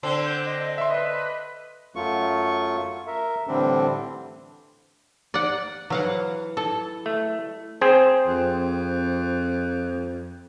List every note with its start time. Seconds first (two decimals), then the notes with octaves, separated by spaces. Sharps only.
0.03 D3 C4 C6
0.25 G6
0.45 D#5
0.78 E5 C6
0.91 B4 D#5
1.96 F#2 F#3 A3 F4 C#6
3.07 A#4 E5
3.47 A2 D3 E3 G3 C4 D4
5.34 D5 F#5
5.90 E3 F#3 F5 F#5
6.57 A4
7.06 A3
7.81 C4 G#4 C5
8.27 F2